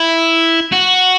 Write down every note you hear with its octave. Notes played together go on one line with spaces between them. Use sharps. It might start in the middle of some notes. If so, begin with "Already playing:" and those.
Already playing: E4
F#4